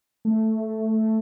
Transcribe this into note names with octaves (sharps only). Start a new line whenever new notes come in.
A3